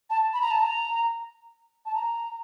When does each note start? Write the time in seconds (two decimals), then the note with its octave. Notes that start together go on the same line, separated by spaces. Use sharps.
0.10 A5
0.33 B5
0.42 A#5
0.51 A5
0.60 A#5
1.86 A5
1.94 A#5